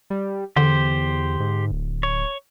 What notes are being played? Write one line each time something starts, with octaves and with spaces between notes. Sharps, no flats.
G3
E2 D3 G4 C5
G#2
D1
C#5